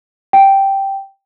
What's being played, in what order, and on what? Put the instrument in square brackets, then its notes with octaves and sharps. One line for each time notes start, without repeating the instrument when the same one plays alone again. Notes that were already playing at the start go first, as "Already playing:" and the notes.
[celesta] G5